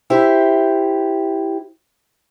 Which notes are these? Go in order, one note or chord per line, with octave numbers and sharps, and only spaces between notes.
E4 G4 C5